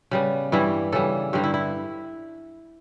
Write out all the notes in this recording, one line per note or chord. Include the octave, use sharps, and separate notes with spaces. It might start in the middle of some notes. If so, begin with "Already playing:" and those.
C#3 G3 B3
G2 E3 G3 E4
C#3 E3 G3 A4
G2 D3 G3 G4
E4
E4